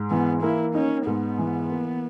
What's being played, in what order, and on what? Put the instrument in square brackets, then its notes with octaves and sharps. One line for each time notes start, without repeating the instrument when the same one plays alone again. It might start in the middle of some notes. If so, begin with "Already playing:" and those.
Already playing: [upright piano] G#2
[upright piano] E3 [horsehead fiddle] B3
[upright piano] A#3 [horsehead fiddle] E4
[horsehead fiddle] C#4 [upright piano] D#4
[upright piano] G#2 [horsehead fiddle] B3
[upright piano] E3
A#3